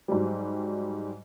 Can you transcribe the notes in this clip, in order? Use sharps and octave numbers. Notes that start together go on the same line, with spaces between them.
G#2 F#3 G3